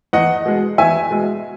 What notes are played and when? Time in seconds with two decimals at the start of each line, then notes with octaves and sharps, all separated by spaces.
0.13 E2 D#5 F#5
0.45 B2 G#3
0.78 E2 E5 G#5
1.10 B2 G#3